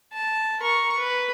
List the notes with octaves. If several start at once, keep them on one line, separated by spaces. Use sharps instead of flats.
A5
A#4 C#6
B4